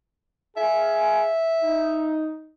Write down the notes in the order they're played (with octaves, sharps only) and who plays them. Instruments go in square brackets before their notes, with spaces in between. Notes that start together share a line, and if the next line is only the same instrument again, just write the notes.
[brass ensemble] G#4 F5 G#5 [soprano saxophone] E5
[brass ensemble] D#4